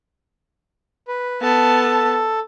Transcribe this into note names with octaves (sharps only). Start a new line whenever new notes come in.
B4
B3 A4 A5